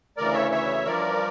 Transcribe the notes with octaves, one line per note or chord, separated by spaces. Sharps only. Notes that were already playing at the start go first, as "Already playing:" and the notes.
D2 C#3 E3 A#4 D5
C#5 E5
C#5 E5
G2 F3 A#4 D5